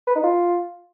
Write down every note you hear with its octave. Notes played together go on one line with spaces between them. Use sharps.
B4
D#4
F4